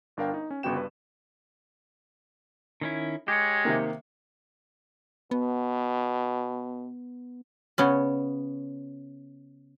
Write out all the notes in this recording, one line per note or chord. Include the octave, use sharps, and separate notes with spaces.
G1 D4 A#4 F5 G5
D#4
C#4
G1 C#3 B3 F#4 G5 E7
G2 B4
D#3 C#4 E4
G#3 G4 C#5
C3 D#3 A#3
B2 B3
C#3 B3 C#4